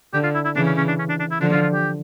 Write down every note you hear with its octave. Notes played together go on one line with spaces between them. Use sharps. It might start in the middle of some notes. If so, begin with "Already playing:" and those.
D3 G4
F4
E4
E4
C#3 E3 D4
C#4
C#4
D4
C#4
D4
D4
E4
D3 F3 D4
F4
F4
G4